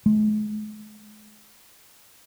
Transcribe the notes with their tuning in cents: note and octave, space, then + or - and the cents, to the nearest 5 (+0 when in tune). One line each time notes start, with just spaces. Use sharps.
G#3 +40